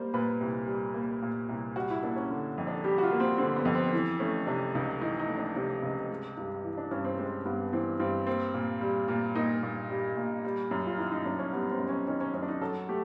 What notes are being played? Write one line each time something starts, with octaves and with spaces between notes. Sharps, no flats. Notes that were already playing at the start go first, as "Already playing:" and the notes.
Already playing: G3 A#3 C5
A#2 B4
C2
G3
A#3
A#2
C2
G3 F#4
E4
A#3 D4
C#4
D3
F2
D4
G3 G4
F#4
F4
A#3
C4
D3 C4
B3
F2
C4
E3
A3 C#4
C3 D4
C#2 D#4
E3 D#4
D#4
A3
D4
C3 D4
C#2
G#3
G2
E3
D4
G2 C#4
C4
G#3 C4
G2 B3
E3 C4
G2 C4
A#3 C4
A#2
G3
A#2
A#3 D#4
A#2
G3
A#2
G3
F#2
F4
D#3 E4
D#4
F#2 D4
C#4
G3 B3
C4
F#2
C#4
D#3 C#4
C#4
F#2 C#4
D4
D#4
F#3 A4
A3 G4